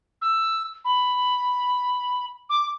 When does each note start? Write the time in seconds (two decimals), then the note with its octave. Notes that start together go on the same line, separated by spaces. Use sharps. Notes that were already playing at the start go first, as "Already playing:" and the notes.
0.22 E6
0.85 B5
2.50 D6